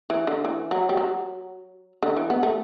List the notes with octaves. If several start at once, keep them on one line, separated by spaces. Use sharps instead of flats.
E3
D3
E3
F#3
G3
F#3
D3
E3
B3
A3